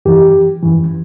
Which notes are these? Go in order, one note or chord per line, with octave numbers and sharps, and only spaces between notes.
F#2 E3 G4
F#2 E3